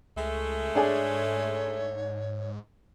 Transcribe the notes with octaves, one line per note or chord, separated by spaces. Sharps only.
C#2 G#3 A3
G#2 D4 G#4 C#5 G#5